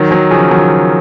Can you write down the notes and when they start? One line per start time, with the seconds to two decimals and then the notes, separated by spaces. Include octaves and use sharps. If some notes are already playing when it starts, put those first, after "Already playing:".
Already playing: D#3 F#3
0.11 D#3 F#3
0.31 C#3 F3
0.51 D#3 F#3